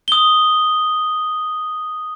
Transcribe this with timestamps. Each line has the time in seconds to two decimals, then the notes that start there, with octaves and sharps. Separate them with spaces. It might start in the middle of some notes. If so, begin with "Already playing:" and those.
0.08 D#6 G7